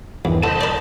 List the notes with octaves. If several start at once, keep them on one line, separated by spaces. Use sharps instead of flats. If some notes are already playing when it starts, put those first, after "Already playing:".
E2 G2 D#3 E3
D3 C5 D#5 A5 B5
A#4 D5